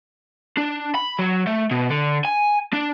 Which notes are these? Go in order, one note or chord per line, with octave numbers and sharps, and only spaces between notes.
D4
B5
F#3
A3
B2
D3
G#5
D4